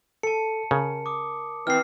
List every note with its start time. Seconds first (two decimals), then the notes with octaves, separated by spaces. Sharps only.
0.23 A4 A5 C#7
0.71 C#3 A#4
1.06 D6 D#6
1.67 E3 C4 F6 C7